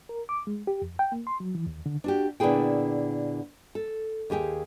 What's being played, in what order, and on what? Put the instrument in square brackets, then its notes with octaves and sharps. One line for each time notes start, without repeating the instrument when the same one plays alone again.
[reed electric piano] A#4
D6
G#3
G4
F2
G5
A#3
C6
F#3
E3
D#2
D3
[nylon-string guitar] D4 F#4 G4
A#2 D3 B3 E4 G#4 G5
A4
D#2 G4 G#4 G5